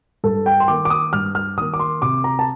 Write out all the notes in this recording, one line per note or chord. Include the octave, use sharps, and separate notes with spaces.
G2 A4
G5
C6
D#3 A#3 D6
D6
D#6
G2 F6
F6
D#3 A#3 D#6
D6
C6
C3 D6
A#5
A5